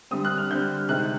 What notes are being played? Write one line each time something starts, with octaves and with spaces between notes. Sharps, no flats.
D3 G3 C4 D#6
F#6
F6
D3 G3 C4 G6
C3 D#3 G#3 F#6